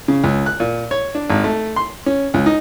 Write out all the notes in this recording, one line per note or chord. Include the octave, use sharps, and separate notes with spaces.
C#3
C#2
F#6
A#2
C#5
D4
G#1
A3
C6
C#4
C#2
D#4